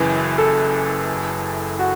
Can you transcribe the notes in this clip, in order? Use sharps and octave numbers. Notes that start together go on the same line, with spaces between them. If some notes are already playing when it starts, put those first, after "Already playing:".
Already playing: F#1 F#2 E3 B4
A4
F#4